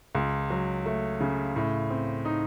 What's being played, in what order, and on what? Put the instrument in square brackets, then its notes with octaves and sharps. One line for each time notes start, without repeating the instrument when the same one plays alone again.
[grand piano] C#2
F#3
A3
C#3
A2
C4
D#4